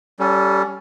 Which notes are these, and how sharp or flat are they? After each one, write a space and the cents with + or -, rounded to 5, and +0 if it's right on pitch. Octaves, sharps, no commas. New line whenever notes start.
G3 -15 C#4 +15 A4 +0